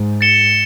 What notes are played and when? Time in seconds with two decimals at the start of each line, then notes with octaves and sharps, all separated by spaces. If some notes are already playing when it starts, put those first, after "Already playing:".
Already playing: G#2
0.21 A6 C#7 E7 G7